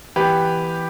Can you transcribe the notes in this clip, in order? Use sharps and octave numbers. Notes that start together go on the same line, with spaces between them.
E3 B3 G4 B4